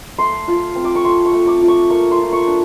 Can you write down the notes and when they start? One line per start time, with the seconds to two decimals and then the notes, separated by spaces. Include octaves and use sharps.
0.19 A3 C6
0.48 F4
0.76 C4
0.84 D6
0.95 C#6
1.05 A3 C6
1.26 C#6
1.33 A3
1.47 D6
1.62 F4
1.68 C#6
1.90 A#3 C#6
2.11 C6
2.19 F4
2.32 C#6
2.47 D4